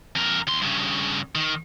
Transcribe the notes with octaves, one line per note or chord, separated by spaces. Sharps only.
F2 A#4
D#2 C6
G2 C#3
D#3